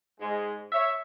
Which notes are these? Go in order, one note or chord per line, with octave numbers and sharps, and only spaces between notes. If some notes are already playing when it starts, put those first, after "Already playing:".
G#2 G#3
C#5 E5